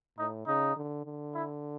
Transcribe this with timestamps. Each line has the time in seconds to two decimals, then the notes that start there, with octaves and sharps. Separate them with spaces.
0.18 A2 D#4
0.47 C#3 D#4
0.76 D3
1.05 D3
1.34 E4